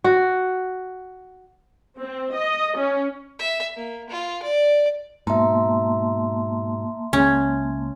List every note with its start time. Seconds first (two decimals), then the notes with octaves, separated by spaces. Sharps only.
0.04 F#4
1.99 C4
2.34 D#5
2.77 C#4
3.39 E5
3.76 A#3
4.10 F4
4.43 D5
5.27 G#2 B2 A#3 E5 A5 A#5 C6
7.13 C#2 C#4